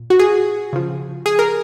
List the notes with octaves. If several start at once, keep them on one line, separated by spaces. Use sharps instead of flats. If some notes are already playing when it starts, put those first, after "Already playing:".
Already playing: A#2
F#4
G#4
C#3 F3
G#4
A#4